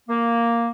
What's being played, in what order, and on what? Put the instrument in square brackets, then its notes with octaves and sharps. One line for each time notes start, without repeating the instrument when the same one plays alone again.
[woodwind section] A#3